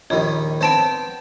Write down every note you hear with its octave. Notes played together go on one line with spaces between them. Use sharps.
A#1 D#2 D#3 C#5
B3 C4 C5 C#5 A5 D7